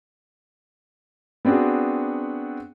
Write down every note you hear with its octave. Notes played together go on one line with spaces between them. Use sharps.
B3 C4 D4 F#4 G#4